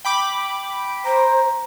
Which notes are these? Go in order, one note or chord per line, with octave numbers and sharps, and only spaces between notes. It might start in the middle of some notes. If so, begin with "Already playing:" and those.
G5 B5 D6
C5 A#5